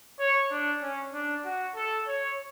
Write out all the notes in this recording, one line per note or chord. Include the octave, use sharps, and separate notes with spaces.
C#5
D4
C#4
D4
F#4
A4
C#5